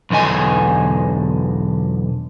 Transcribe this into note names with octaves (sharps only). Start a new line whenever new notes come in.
B1 E2 D3 D#5 G#5